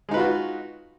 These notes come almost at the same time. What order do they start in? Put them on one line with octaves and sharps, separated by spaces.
G#3 D#4 B4 F4 F#4